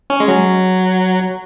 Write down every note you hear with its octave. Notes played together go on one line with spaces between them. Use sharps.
C#4
G#3
F#3